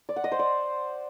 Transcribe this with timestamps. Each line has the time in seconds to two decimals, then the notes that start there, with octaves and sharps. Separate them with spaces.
0.09 D5
0.16 F#5
0.24 D#5
0.32 C5
0.39 D5